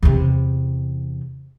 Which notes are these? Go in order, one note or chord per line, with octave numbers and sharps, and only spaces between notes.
E2 C3